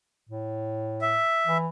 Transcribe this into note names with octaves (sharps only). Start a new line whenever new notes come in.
A2
E5
E3